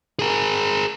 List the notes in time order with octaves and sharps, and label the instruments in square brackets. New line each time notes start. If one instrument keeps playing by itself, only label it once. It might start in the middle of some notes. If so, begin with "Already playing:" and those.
[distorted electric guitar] G#4 A#4